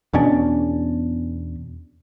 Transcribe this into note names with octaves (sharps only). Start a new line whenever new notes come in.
E2 B2 C#4 D4